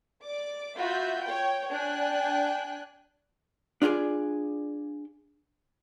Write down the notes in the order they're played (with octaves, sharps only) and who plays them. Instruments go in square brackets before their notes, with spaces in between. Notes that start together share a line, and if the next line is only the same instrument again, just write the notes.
[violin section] D5 D6
F4 F#4 E5 B5 G6
C#5 G5
D4 G5 G#5 F#6
[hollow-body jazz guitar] D4 F4 F#4 G#4 D5